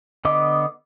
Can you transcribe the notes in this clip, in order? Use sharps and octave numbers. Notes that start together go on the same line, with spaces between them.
D3 B3 D#5 D6